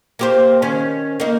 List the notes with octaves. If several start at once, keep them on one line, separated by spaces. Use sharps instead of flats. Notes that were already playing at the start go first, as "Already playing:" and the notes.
A#3 G4 C5
D#3 C#4
A#3 D#4